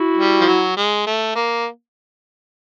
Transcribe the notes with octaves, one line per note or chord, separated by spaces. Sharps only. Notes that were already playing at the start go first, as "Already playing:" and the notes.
Already playing: E4 F#4
G3
F3
F#3
G#3
A3
A#3